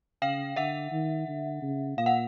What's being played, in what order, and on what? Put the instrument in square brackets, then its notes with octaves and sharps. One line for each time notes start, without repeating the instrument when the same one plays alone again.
[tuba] C#3 [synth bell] F5 G5
[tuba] D3 [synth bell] E5 F#5
[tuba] D#3
D3
C#3
[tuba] A#2 [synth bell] F5
[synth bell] F#5